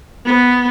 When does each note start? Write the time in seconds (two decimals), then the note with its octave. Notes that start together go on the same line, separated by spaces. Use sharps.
0.26 B3